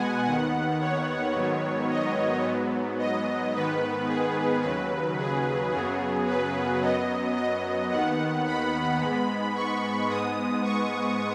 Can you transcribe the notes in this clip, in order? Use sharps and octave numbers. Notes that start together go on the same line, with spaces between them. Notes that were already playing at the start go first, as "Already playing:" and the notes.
Already playing: B2 G#3 B3 F#5 G#5
D#2 D#3 B3 F#5
C#5
G#2 D#3 F#3 B3
D#5
G#2 F#3 B3
D#5
G#2 D#3 B3 B4
G#4
D#2 C#3 F#3 B4
G#4
F#2 C#3 F#3 B3 G#4
B4
F#2 F#3 B3 D#5
D#5
D#2 D#3 B3 F#5
B5
G#2 G#3 B3
C#6
G#2 G#3 B3 D#6
C#6